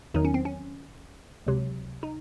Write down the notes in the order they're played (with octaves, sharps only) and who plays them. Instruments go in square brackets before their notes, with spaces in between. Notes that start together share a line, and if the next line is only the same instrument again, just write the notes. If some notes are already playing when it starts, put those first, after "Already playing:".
[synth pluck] E2 D#3 F#3 D#4
C#4
C4
C#4
C#2 C3 F#3
D#4